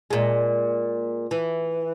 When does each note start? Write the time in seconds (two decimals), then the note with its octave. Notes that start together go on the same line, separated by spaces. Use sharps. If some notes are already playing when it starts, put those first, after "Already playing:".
0.11 A#2 G#3
1.31 E3